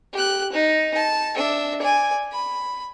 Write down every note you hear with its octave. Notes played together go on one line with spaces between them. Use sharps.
G4 F#6
D#4
A5
D4 E5
D5 G#5
B5